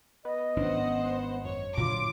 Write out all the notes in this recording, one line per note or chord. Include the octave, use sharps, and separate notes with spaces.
B3 D#5
G#1 C#4 D4 C5 F#5
F#2 C#5
A#2 D3 F#3 F4 D6